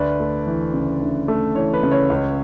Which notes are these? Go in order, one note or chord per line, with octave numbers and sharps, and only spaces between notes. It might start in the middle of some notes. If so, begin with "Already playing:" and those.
Already playing: D2 B4 D5
A3
E3
C#3
D2
A3
E3 C#5
B4
C#3
C#5
C#2